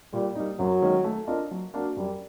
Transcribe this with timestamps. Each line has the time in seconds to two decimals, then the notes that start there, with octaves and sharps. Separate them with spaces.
0.13 A#2 G3
0.35 G3 A#3 D#4
0.59 F#2 F#3
0.82 D#3 G#3 C#4
1.04 A3
1.27 D4 F4 A#4 D#5
1.51 F#3
1.74 A#3 D4 F#4
1.97 F#2 G3